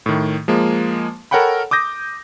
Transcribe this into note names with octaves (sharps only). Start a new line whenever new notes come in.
A2 D#3
F3 G#3 A#3
A4 A#4 C#5 F#5 G5 B5
D6 D#6 G6 A#6